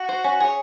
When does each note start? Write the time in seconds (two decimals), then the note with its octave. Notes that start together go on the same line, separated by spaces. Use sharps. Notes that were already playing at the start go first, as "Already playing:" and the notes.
Already playing: F#4
0.09 C5
0.24 C#4
0.40 G#4 C#5